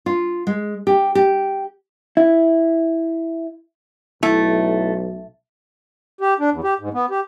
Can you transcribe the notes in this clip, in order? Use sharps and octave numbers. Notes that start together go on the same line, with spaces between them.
F4
G#3
G4
G4
E4
B1 A3 E4
G4
D4
E2
G4
G#2
B3
G4